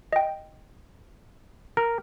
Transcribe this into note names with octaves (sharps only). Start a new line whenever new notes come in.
D#5 G5
A#4 F6